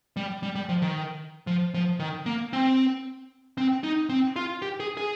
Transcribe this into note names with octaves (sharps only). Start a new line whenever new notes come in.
G3
G3
G3
F3
D#3
F3
F3
D#3
A#3
C4
C4
D#4
C4
F4
G4
G#4
G#4